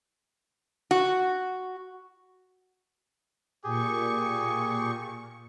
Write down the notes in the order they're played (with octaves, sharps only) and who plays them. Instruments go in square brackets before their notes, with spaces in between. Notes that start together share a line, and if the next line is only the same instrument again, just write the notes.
[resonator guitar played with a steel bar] F#4
[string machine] A#2 C#6 [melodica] G4 G#4